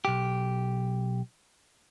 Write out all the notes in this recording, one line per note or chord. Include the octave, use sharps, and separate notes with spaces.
B1 G4